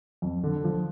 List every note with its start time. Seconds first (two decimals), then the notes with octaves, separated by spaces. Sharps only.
0.22 F2
0.43 D3
0.64 F3